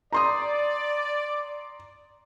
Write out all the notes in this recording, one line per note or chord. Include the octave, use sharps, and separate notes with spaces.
D5 A#5 C6 D#6